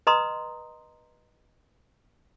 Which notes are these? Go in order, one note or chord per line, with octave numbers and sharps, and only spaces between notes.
B4 D#5 A#5 C6 D#6